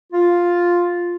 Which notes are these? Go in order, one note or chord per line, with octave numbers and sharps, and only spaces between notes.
F4